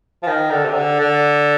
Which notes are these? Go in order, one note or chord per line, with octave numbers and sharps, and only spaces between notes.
F3
D#3
D3
C3
D3
D3